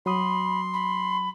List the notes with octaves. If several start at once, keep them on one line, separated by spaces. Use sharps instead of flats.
F#3 B5 C6 D#6
B5